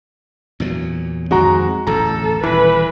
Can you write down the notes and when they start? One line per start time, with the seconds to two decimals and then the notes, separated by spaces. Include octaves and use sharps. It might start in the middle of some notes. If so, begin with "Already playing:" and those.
0.60 E2 A#2 F#3
1.31 F2 D#3 G#3 C4 F#4 A#5
1.87 D1 A1 E2 A4 A#5
2.43 D#1 E3 B4